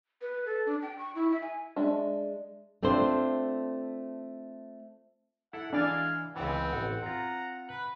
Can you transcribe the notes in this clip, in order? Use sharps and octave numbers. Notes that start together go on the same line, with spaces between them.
B4
A4
D4
G5
C#6
E4
E5
G#5
G#3 D4 E5 A5
A3 C4 D4 F4 C5
E4 A4 F#5
E3 G#3 D4 D5 F5 G#5 A6
C#2 E3 B3 C4
A1 F#5
C4 F4 A#5
B4 B5 F#6